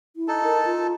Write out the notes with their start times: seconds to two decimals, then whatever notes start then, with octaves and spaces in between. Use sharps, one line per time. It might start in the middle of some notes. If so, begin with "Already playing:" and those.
0.16 E4
0.28 D#4 A4 A5
0.44 A#4
0.66 F4